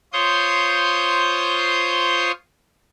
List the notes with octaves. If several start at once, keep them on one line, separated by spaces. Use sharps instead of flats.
F4 C5 C#5 C6 D#6 G6